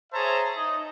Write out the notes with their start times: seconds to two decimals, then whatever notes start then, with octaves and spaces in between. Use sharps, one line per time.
0.12 G#4 C5 C#5 E5 A5 A#5
0.55 D#4 D#5